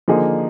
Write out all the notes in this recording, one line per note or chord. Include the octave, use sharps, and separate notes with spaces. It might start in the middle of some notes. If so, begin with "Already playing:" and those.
D3 F3 A#3 D#4 G#4